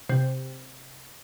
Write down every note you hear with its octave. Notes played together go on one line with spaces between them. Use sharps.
C3